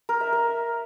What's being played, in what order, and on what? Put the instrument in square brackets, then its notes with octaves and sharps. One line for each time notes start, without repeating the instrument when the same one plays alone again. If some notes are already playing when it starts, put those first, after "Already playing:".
[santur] A#4
E5
A#4